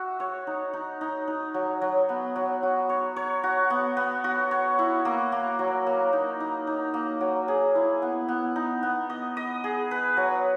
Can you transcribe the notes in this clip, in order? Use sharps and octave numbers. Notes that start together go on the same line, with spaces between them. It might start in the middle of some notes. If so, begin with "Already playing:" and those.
Already playing: F#4 E5
C#5
D#4
D#4
D#4
D#4
F#3
F#3
B3
F#3
F#4
C#5
C#5
F#4
B3
B3
F#4
C#5
E4
A#3
A#3
F#3
A#3
D#4
D#4
D#4
A#3
F#3
G#4
E4
B3
B3
D#4
B3
D#5
D#5
G#4
B4
F#3